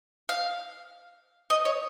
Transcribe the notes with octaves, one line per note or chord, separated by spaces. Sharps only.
F5
D#5
C#5